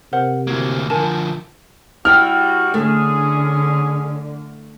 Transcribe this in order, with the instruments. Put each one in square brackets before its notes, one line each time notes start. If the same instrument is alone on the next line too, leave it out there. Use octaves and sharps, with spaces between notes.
[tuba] C3 [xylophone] A#4 C5 [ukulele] F#5
[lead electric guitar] D2 A#3 [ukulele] E4 F#4 C#5
[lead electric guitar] D3 F3 [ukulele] A#4 G#5 [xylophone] A5
[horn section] G3 F#4 [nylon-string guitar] E4 G5 [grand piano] F6
[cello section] D3 [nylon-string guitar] A3 [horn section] C#4 G#4